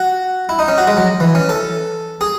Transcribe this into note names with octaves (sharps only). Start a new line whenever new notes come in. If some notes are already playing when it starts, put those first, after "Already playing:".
Already playing: F#4
E4
D#4
C#4
F#4
G#3
F#3
E3
C#4
A4
G#4